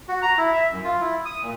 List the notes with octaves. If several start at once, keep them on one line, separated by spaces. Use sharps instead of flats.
F#4
A#5
E4
E5
F#2
F4
E4
D#6
A#2